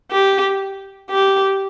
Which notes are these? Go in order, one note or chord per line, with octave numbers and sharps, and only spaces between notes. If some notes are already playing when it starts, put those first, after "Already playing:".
G4
G4